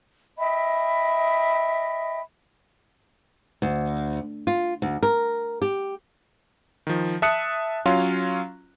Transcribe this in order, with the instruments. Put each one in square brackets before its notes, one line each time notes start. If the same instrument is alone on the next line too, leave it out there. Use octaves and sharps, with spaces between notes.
[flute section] D#5 E5 G5 B5
[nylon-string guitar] D2
F4
D2
A#4
G4
[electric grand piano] D#3 F3
E5 A5 D#6 F#6 C#7
F#3 C#4 F4 F5 C6